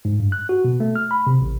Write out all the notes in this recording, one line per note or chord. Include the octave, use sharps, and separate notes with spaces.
G#2
G2
F#6
F#4
B2
A3
F6
B5
C3
A1